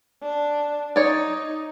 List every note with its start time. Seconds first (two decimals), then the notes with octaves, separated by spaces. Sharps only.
0.22 D4
0.96 D#4 C#5 D5